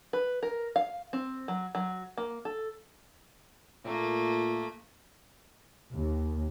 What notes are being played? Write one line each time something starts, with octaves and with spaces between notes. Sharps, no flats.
B4
A#4
F5
C4
F#3
F#3
A#3
A4
A#2 A3 A#3
D#2